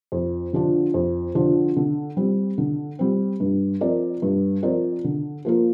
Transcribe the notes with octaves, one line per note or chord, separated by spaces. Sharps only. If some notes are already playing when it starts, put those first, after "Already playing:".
F2
D3 F3 D4
F2
D3 F3 D4
D3
G3 C4
D3
G3 C4
G2
F3 C4 A#4 D5
G2
F3 C4 A#4 D5
D3
F3 A#3 F4 A#4